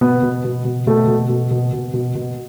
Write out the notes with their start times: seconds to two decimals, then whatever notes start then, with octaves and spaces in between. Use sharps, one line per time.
0.01 B2 B3
0.23 B2
0.44 B2
0.65 B2
0.87 B2 A3
1.07 B2
1.29 B2
1.51 B2
1.73 B2
1.94 B2
2.15 B2